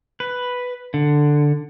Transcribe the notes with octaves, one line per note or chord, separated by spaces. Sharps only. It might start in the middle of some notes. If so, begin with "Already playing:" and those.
B4
D3